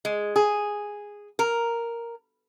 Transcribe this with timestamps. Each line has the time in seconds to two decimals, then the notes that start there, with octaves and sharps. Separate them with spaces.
0.05 G#3
0.36 G#4
1.39 A#4